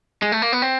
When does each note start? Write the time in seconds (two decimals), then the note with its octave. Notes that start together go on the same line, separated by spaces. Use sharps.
0.22 G#3
0.32 A3
0.42 A#3
0.53 B3
0.62 C4